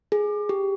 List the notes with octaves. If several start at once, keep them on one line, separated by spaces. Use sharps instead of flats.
G#4
G4